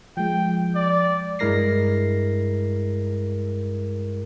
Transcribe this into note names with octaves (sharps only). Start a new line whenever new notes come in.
F3 G#3 G5
D5
G2 G#3 E4 A#4 A#6 C7